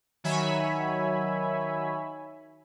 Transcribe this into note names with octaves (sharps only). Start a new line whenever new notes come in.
D#3 F#3 C#5 E5 G#5 B5